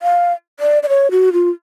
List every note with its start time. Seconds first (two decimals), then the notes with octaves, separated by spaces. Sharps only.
0.02 F5
0.60 D5
0.83 D5
0.89 C#5
1.11 F#4
1.33 F4